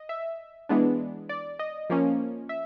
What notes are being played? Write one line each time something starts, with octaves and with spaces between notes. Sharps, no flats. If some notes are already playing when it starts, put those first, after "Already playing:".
Already playing: D#5
E5
E3 G#3 B3 D4
D5
D#5
F3 A#3 C#4
E5